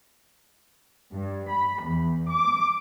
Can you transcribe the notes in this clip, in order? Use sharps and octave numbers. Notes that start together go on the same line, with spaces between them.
G2
B5
E2
D6